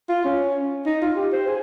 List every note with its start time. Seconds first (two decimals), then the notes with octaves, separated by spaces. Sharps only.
0.09 F4
0.24 C#4
0.86 D#4
1.01 F4
1.16 G4
1.32 C5
1.47 G#4